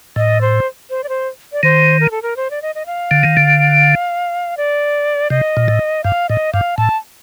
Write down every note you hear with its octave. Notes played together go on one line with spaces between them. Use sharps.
A2 D#5
C5
C5
D5
C5
D5
D#3 C5
A#4
A4
A#4
C5
D5
D#5
D#5
F5
D3
D#3
D3
D5
C3 D#5
A#2
A2
G2 F5
A2 D#5
G2 F5
A2 A5